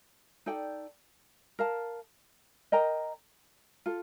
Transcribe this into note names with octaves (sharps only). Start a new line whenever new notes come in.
D#4 A4 D5 G5
A#4 F5 A5
A#4 D#5 G5 A#5
F4 A4